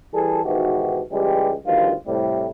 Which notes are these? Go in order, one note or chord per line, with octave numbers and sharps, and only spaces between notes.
E3 G3 G#4 A4
G#2 B2 D#3 E3 F#4 G4
C#2 E3 G3 G#3 G4
D2 B2 D#3 F3 G3 F4
A2 C3 G3